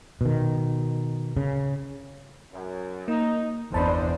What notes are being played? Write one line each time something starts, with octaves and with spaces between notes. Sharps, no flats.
B2 D#3
C#3
F#2
A#3 D#4
G1 E2 D3 D4 D#4 C5 A5 B5